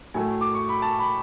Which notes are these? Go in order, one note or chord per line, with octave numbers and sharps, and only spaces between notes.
A2 F#3 A3 G#5
D6
C#6
B5
A5
B5